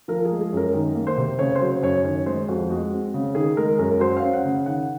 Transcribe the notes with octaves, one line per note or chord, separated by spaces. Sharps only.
F3 A#4
G#4
G#3
G#4
F#2 A#4
D#3
A#3
C5
C3
C#3 C#5
C5
F#3 C#5
F#2 C#5
D#3 C#5
G#3 C5
F2 F#4
G#3 F#4
C4
C#3
D#3 G#4
G#3 A#4
F#2 A#4
F#3 C5
F5
C#4
F#5
C#3
D#3 F#5